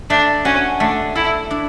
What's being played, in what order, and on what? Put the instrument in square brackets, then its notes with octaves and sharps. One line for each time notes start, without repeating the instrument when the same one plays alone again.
[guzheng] A3 [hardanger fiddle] D4
[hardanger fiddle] C#4 [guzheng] F#4
[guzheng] A3 [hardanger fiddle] D4
[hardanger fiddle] E4 [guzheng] A4
[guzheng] D4